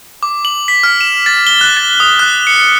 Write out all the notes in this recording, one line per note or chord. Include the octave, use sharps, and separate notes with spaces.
D6
F#7
B6
F6
E7
A6
G7
F#6
A6
D#6
F#6
C#7